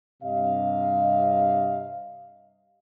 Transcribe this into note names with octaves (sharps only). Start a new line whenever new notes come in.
G2 C3 D#5 F5